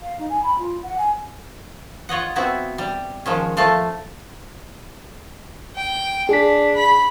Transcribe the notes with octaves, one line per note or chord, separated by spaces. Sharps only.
F5
D#4
G#5
B5
F4
F#5
G#5
F4 C#5 D#5 F#5
B3 C4 E4 F#4
G3
D#3 F3 G#3 C#4
F3 A3 F5 A5
G5
D4 G#4 B6
B5